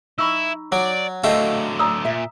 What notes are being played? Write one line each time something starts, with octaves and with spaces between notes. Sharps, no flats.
D#4 E4 B5 C#6 E6
F#3 D5
D3 F#3 A3 A4 D#5 F5 G5
D5 A#5 D#6 E6
A#2 E5